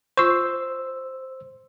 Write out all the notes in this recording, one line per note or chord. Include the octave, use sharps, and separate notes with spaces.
F4 C5 C#6 E6